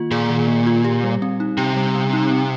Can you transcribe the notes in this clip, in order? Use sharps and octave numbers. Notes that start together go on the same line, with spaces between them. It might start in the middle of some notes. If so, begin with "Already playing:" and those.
Already playing: D#3 A#3 F4
A#2 G#4
D#3
A#3
F4
G4
G3
C4
D#4
C3 G4
G3
C4
D#4
C4